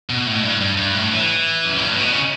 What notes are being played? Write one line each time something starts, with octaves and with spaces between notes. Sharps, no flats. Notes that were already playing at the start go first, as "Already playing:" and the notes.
B2
A2
G2
G2
G2
A2
E3
F#2
G2
A2
B2
C#3